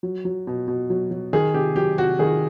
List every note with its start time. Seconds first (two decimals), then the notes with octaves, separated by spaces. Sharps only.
0.03 F#3
0.25 F#3
0.47 B2
0.68 B2
0.90 F#3
1.11 F#3
1.33 D#3 G#4
1.54 C3 G4
1.76 F#3 G4
1.98 C3 F#4
2.19 D#3 G#4